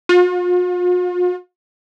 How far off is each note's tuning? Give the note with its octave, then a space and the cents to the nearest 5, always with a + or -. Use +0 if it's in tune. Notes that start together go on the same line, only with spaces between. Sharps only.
F4 +45